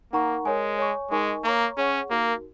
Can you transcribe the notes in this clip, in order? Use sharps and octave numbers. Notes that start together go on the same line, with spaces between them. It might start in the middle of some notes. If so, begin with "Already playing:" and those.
A#3 D#4 A#4 F#5 A#5 C#6
G#3 A#4 C#5 G#5
C#5 G#5 C#6
G#3 D#4 A#4 D#5 G#5 C#6
A#3 C#5 A#5 C#6
C#4 G#4 C#5 F#5 C#6
A#3 D#4 F#4 A#4